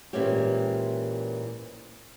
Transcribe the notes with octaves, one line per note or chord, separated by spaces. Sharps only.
A#2 E3 G#3 C4 C#4 G4